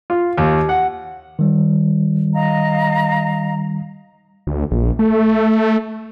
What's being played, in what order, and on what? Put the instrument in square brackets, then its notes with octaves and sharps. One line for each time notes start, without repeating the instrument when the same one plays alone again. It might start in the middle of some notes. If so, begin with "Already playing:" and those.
[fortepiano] F4
D#2
F#5
[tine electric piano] D#3 G3
[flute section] D#5 F5 A#5
[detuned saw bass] D2
A#1
A3